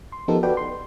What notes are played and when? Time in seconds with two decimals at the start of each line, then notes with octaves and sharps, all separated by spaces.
0.12 C6
0.28 F3 B3 D#4 G4 A4 A#4
0.43 F#4 A4 B4 D5 G5
0.57 C6